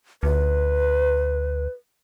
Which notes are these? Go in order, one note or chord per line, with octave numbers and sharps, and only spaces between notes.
D2 B4